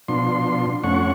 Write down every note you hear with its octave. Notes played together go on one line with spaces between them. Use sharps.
B2 F3 D4 C6
F2 A3 C#4 F#5 C#6